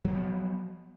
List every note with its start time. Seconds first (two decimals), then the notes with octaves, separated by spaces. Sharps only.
0.04 F#3
0.08 A#3
0.11 F3
0.15 B3